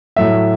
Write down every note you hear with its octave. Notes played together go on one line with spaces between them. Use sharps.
A2 F#3 A3 E5